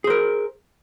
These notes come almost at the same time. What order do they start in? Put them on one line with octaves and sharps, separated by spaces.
G#4 C5 A#4